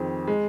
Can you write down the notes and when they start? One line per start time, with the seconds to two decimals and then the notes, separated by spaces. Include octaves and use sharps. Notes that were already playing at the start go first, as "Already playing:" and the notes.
Already playing: F2 D#3 C4 G#4
0.27 G#3